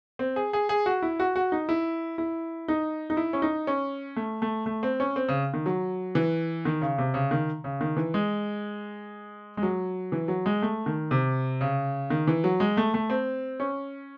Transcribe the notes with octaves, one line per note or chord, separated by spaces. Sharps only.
C4
G#4
G#4
G#4
F#4
E4
F#4
F#4
D#4
E4
E4
D#4
D#4
E4
C#4
D#4
C#4
A3
A3
A3
C4
C#4
C4
C#3
D#3
F#3
E3
D#3
C#3
C3
C#3
D#3
C#3
D#3
E3
G#3
G#3
F#3
E3
F#3
G#3
A3
D#3
C3
C#3
D#3
E3
F#3
G#3
A3
A3
C4
C#4